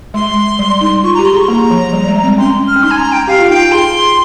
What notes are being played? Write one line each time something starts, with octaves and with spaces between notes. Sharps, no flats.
G#3 C6
G3
D#4
F4 C#6
G4 A#5
C6
G#4 C#6
A#3 A#5
F3
G3
G#3
C4
C#4 C6
F6
C#4
D#4 C6
G#5
A#5
G5
G4 F5
F4
D#4 G5
F4
G#4 C6